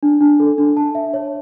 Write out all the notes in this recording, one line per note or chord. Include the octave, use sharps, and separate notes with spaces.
D4
D4
A4
D4
A5
E5
C#5